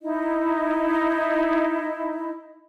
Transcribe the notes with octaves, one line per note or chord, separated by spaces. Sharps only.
D#4 E4 D#5